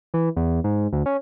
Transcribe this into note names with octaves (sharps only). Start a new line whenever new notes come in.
E3
E2
G#2
D2
C#4